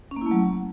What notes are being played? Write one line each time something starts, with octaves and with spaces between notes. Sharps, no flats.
C#4
A#3
E4
A3
F#3